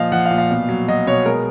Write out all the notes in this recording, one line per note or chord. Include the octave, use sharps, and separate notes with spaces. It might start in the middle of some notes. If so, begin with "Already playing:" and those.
Already playing: A#2 F3 D#5 F5
F3 F#5
F5
A#2
F5
B2
F#3
F#3 D#5
B2 C#5
G#3 A#4